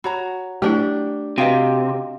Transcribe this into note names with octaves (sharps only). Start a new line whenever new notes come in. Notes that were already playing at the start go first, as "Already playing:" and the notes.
F#4 C#5 A#5 B5
A3 D4 E4 G4
C3 F#4 B4 D#5 F5 G5